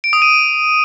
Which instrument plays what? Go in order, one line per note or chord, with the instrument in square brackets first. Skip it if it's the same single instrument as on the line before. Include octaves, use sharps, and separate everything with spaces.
[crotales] D7
D#6
D#7